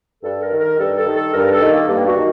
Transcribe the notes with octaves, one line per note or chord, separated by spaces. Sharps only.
G2 A4
A#4
D#3
A#4
G2 A4
A4
D#3
A4
G2 A#4
A4
D#3
A#3
G2 A#3
F#4
D#3